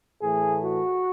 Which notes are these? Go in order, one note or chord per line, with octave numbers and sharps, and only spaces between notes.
A2 E3 A3 G#4
F#4